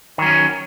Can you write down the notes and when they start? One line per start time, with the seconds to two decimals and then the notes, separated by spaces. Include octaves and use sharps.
0.18 D#3
0.22 F#3
0.26 C#4